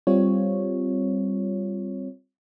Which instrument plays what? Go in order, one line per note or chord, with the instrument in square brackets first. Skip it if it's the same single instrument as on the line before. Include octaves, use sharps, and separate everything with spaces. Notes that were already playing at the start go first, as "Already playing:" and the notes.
[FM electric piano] G3 C4 F4 C#5